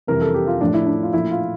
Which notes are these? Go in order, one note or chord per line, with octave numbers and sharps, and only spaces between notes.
F2 C3 E3 G3 A#4
A4
G4
F4
A2 F3 A3 D4
E4
D4
F4
A#2 F3 A3 E4
F4